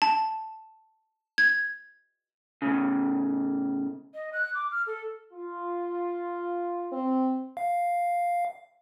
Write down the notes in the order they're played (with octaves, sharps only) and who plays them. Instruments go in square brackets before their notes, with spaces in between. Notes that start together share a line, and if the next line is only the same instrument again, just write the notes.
[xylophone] A5
G#6
[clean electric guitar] A2 C#3
[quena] D#5
F#6
D6
F6
A4
[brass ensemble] F4
[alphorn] C4
[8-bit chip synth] F5